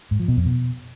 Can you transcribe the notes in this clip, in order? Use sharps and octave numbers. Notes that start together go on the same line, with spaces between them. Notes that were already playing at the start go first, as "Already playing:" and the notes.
G#2
F3
B2
F2
B2